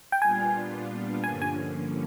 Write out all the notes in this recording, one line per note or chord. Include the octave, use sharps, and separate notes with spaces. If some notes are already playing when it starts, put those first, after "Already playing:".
G5
A#2 G3 B3 D4 F4 G#5
G2 D3 F3 A#3 C#4 G#5
G#5